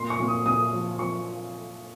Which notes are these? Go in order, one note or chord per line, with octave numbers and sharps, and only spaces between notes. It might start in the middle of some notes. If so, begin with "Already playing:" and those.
Already playing: A#2 C6
C#6
A#2
D#6
A#2 D#6
F3
F3 C#6